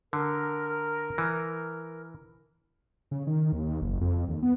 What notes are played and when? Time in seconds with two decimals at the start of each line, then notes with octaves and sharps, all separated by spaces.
0.13 D3 A#4
1.18 E3
3.11 C#3
3.27 D#3
3.52 D#2
3.82 F#1
4.01 F2
4.28 D#2
4.43 B3